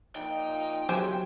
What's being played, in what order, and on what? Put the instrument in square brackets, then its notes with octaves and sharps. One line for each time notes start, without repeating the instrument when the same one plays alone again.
[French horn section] A#2 F3 D#4 [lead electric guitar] G5
[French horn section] E2 A#2 C#3 [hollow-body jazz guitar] F#3 G4 [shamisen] C5 G#5